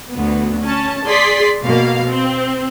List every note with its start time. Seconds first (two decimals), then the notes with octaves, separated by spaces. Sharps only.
0.11 D2 B3
0.62 C#4 A5
1.06 G#4 D5 C6 B6
1.64 B2 A#3 F5
2.07 C4